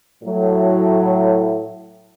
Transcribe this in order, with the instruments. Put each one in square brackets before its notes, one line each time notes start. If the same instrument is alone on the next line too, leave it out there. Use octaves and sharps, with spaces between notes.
[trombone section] A2 [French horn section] F#3